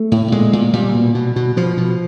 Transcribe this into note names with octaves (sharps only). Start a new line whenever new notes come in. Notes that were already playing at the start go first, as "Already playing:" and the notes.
Already playing: A3
A2
A#2 G#3
A#2
A#2 G3
B2
B2
B2
B2 F3
B2